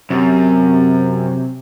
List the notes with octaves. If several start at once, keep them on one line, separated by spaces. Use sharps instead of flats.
F#2 C3